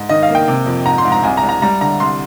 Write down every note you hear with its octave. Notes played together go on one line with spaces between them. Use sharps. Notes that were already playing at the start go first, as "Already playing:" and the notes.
Already playing: G#2
D#3 D#5
F5
A#3
G5
C3
F2
G#2 A#5
C6
G#2
A#5
C2 G#5
A#5
C2
A#5
G3 A#5
D3 A#5
C2 C6